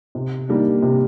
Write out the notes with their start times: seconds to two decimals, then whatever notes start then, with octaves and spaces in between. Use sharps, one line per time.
0.15 C3
0.49 D#3 G3 A#3 D4
0.83 C3